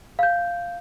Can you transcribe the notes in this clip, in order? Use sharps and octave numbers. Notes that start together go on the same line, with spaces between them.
F5 G6